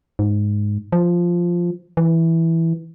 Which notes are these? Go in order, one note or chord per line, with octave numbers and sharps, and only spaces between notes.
G#2
F3
E3